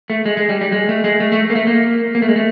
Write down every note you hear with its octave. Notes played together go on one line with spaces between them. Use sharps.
A3
G#3
G#3
G3
G3
G#3
A3
G#3
A3
A3
A#3
A3
A#3
A#3
A3
G#3
A3